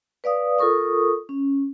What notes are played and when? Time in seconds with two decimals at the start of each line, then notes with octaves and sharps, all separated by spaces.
0.24 B4 D5 F5 D#6
0.59 F4 A4 A#4 C#6 D#6
1.29 C#4